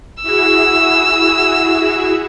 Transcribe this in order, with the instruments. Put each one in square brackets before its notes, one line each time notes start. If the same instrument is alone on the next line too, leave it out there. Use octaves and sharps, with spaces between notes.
[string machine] E4 F#4 G#4 [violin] E6